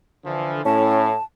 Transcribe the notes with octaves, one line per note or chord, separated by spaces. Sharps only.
D3 E3 F3
A2 C#4 A5